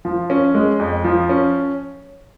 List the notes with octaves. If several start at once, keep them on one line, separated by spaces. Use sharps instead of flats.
F3
C#4
G#3
F2
F3
C#4